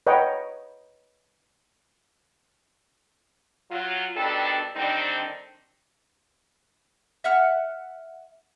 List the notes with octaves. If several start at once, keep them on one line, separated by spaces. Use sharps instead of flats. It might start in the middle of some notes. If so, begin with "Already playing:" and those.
B4 C#5 D#5 F#5 G5 A#5
F#3 F4
F2 B2 D#3 G3 D4 A4
D3 D#3 G3 C4 D4 D#4
E5 F#5 F6